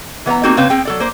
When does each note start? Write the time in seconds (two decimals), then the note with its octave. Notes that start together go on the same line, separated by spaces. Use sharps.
0.26 E3 B3 C#5 A#5
0.43 G3 A#3 C4 D#4 F#4 G#4
0.57 C#3 A#3 C4 B4 C#5 F5
0.70 C4 G#4 G5
0.85 F#3 A4 D5
1.00 A#3 C5